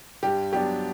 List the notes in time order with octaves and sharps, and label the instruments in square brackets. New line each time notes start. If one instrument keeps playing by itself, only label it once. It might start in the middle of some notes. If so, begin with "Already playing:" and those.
[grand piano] G2 [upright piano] G4
[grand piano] F#3 B3 D4 [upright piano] G4